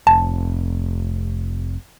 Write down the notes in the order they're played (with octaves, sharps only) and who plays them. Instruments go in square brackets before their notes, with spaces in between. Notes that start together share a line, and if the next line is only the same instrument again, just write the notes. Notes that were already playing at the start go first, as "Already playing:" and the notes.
[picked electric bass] F1 [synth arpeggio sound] A5